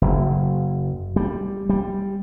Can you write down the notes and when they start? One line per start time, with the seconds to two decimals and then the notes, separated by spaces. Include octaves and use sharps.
0.02 F#1
1.16 G3
1.69 G3